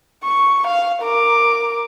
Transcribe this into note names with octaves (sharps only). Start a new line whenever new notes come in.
C#6
F5
A#4 D6